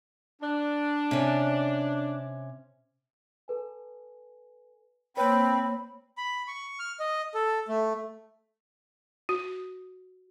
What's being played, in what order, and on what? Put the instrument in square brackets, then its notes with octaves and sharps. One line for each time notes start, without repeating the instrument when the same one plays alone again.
[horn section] D4
[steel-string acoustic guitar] C3 C#4
[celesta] A4 B4 G#5
[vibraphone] A#3 C#5 [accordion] C4 [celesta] B4 [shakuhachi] B5
[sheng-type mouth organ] B5
C#6
F6
D#5
A4
A3
[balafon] F#4